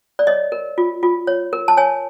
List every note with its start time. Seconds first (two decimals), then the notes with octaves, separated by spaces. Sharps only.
0.19 D5
0.27 C#5 D#5
0.52 A#4
0.78 F4
1.03 F4
1.27 C#5
1.53 A#4
1.68 A5
1.77 C#5 G#5